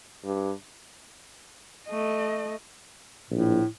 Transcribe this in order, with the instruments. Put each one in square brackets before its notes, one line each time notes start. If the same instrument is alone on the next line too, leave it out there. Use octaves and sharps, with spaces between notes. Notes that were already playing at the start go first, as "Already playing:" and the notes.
[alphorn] G2
[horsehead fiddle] A3 D#5
[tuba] A#1 [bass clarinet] A2